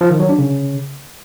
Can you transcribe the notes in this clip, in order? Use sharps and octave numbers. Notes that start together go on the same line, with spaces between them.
F3
D#3
F#3
D4
C#3